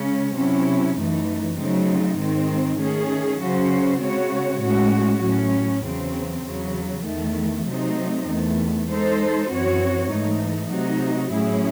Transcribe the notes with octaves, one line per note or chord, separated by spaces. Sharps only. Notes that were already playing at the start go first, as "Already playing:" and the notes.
Already playing: C#3 G#3 C#4
C3 F#3 C#4 E4
F#2 E3 A3 D#4
C#3 F#3 A3 C4 D#4
G#2 D#3 G#3 C4 D#4
D#3 A3 C#4 G#4
C#3 F#3 C#4 F#4 C5
C#3 G#3 C4 F#4 C#5
A2 G#3 C#4 F#4
A2 F#3 C#4
E2 C#3 F#3 C4
E2 C#3 F#3
E2 D#3 A3
C3 F#3 A3 C4 D#4
E2 D#3 A3
G#3 D#4 A4 C5
F#2 E3 C4 F#4 C#5
G#2 E3 A3 D#4
C3 F#3 A3 D#4 F#4
A2 F#3 C#4 E4 G#4